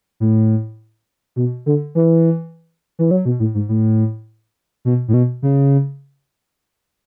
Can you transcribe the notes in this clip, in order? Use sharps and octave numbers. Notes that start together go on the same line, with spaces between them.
A2
B2
D3
E3
E3
F#3
B2
A2
G#2
A2
B2
A2
B2
C#3